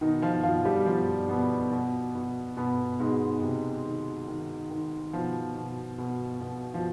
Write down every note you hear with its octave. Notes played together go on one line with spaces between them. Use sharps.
B2 D#3 D#4
F3 F4
B2 F3 F4
G3 G4
B2 F3 F4
B2 B3
B2
B2
B2 B3
G#2 B2 G#3
C3
D#3
D#3
D#3
B2 F3
B2
B2
B2
F3